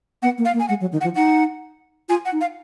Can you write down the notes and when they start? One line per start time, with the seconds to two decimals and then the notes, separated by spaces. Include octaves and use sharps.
0.22 B3 F#5
0.38 A#3
0.45 F5
0.53 A#3
0.60 G#5
0.68 G#3 F#5
0.81 F#3
0.93 D#3
1.01 F#5
1.04 F3
1.15 D#4 F#5
2.09 F4 G#5
2.25 F#5
2.32 D#4
2.41 F5